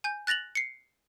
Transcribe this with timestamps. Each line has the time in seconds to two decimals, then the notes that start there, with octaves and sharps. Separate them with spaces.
0.04 G#5 G6
0.27 F#6 A6 A#6 F7 F#7
0.55 C7 C#7